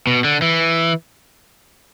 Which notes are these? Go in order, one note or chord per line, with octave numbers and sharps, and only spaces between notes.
B2
D3
E3